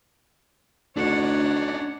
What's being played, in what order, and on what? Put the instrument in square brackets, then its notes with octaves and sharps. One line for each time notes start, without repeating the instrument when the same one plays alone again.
[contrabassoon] D2 [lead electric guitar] D4 D#4 [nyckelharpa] C#5 F#5